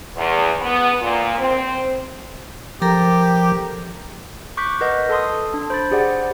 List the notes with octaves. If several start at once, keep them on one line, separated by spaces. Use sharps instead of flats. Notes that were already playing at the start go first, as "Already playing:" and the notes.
E2
B3
A#2
C4
F3 G4 A4 A#4 A#5
C#6 D6 F#6 G6 B6
A#4 B4 D#5 F#5 G6
A4 A5 C6 D#6
D4
C5 B5 A6
G4 G#4 C5 D5 F#5